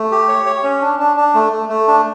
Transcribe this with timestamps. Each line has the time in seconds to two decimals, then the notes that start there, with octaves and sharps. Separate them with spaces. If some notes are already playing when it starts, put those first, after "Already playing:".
Already playing: A3
0.12 G4
0.28 C#5
0.46 C#5
0.63 C#4
0.82 D4
0.99 D4
1.17 D4
1.34 A3
1.53 A3
1.69 A3
1.88 D4